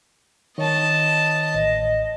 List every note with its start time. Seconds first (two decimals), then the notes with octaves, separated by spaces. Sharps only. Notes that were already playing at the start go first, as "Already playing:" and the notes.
0.58 D#3 C#5 D#5 A5
1.54 A1 D#5